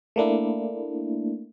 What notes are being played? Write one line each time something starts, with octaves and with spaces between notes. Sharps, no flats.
A3 A#3 D4 E4